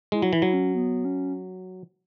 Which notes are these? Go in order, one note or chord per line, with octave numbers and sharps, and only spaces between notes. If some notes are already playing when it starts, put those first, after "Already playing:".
G#3 E4
F#3
E3 E4
F#3
C#4
B3
C#4